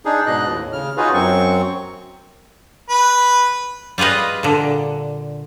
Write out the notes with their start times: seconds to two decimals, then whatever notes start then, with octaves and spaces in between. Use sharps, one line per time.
0.05 D4 D#4 G#4
0.27 G#2 B2 D4 D#5 F#6
0.48 D#2 A2
0.73 C#3 F6
0.97 C#4 D#4 F4 F#4 G#4 B4
1.14 F#2 F#3 C4 C#6
2.89 B4
3.98 G3 F4 G#4 B4 D#5
4.43 A#2 D3